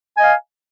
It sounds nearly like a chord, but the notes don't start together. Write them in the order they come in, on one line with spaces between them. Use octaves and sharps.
G#5 D#5 F5